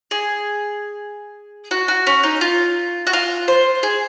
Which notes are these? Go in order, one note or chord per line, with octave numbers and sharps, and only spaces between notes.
G#4
F#4
F#4
C#4
D#4
F4
F#4
F4
C5
G#4